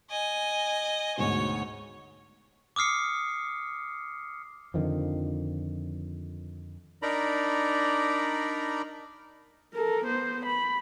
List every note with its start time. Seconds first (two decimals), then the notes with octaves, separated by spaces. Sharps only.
0.10 D#5 G#5
1.17 D2 G#2 B2 C#5
2.76 D6 D#6 F6 C7 C#7
4.74 F2 D3 D#3 F3
7.02 D4 D#4 A#4 D5 A#5 B5
9.74 A4 A#4
10.05 B3 C5
10.46 B5